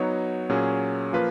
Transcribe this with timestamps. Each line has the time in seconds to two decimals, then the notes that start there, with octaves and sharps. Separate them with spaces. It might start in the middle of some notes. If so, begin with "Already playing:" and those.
Already playing: F#3 B3 D#4 F#4 C#5
0.49 A#2 F#3 C#4 G#4
1.13 F3 A#3 F4 B4